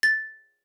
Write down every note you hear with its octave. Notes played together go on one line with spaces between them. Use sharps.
A6